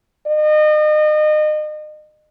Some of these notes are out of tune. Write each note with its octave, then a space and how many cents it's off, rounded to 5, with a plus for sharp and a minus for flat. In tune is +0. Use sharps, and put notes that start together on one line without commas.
D#5 -35